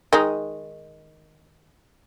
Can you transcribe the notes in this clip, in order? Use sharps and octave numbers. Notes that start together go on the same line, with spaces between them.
D#3 G#3 D#4